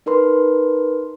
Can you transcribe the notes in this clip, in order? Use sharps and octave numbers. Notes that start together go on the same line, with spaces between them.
D#4 A#4 B4 C6